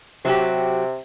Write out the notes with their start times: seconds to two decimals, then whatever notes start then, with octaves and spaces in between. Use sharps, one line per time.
0.25 C3 F#3 F#4 G4